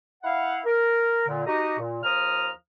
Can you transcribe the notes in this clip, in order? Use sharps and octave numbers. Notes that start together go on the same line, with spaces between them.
E4 F5 F#5
A#4
A#2 D3
D#4 F#4 G4 D#5
A#2
D#2 F3 A#5 D#6 F6